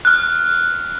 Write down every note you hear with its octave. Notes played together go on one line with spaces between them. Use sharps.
F6 F#6